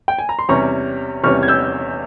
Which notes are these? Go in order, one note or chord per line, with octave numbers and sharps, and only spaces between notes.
G5
G#5
A#5
C6
E2 C3 G3 C#4 A#5 C#6
E2 C3 G3 C#4 C#6 F6
G#6
E6 G6